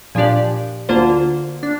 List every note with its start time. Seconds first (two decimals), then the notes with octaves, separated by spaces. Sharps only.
0.15 A#2 F3 D4 G4 D5
0.89 D2 D3 A#3 F4 C5
1.63 D4